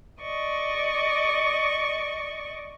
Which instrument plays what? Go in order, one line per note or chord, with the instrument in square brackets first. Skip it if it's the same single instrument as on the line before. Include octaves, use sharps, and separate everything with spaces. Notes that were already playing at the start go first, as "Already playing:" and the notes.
[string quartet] D5 D#5 C#6